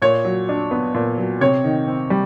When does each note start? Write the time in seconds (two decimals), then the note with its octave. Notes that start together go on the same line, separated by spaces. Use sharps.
0.02 A#2 C#5
0.25 F#3
0.49 D4
0.71 B3
0.94 A#2
1.17 F#3
1.41 C3 C#5
1.64 D#3
1.88 C4
2.10 G3